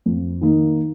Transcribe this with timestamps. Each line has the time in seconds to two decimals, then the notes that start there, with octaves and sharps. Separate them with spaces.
0.06 F2
0.41 D#3 A#3 D#4